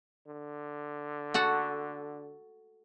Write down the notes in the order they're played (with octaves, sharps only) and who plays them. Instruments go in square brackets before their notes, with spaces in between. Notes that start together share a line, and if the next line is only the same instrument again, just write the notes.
[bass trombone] D3
[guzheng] F#4 A4 F#5